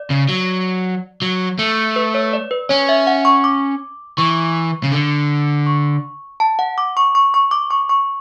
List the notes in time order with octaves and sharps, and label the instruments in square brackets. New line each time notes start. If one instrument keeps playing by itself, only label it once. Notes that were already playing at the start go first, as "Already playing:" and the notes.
Already playing: [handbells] D5
[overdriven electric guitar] C#3
F#3
F#3
A3
[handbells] B4
C#5
D5
B4
[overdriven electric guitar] C#4 [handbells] C#5
[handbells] E5
F#5
C#6
D6
[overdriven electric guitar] E3 [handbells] C#6
[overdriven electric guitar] C#3
D3
[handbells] C#6
A5
F#5
D6
C#6
C#6
C#6
D6
C#6
C#6